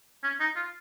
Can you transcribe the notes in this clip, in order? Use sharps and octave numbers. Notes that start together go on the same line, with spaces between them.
C#4
D#4
F4